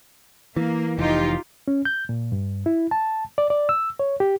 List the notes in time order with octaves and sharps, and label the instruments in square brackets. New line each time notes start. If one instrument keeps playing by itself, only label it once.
[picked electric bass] E3 [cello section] A#3
[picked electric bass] F1 E3 [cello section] D#4 F4 G4
[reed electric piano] C#4
G6
A#2
G2
E4
A5
D5
D5
E6
C#5
G4